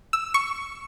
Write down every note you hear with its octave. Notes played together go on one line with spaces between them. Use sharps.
E6
C#6